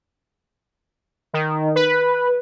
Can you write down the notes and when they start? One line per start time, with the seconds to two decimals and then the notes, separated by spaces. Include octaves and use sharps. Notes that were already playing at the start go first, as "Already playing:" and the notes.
1.34 D#3
1.75 B4